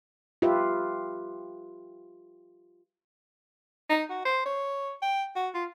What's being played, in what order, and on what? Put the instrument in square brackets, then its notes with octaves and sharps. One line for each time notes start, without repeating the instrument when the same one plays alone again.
[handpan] F4 G4 B4 E5
[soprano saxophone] D#4
F#4
C5
C#5
G5
F#4
F4